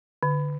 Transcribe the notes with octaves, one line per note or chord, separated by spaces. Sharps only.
D3